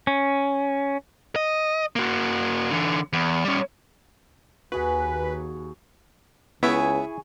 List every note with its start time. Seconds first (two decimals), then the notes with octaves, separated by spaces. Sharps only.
0.07 C#4
1.36 D#5
1.96 A#3 F#4
2.71 D3 E3
3.13 E2
3.45 G3 C#4
4.72 D#2 F#4 G#4 B4 F#5
6.63 C#2 B3 E4 G#4 E5 G#5 C#6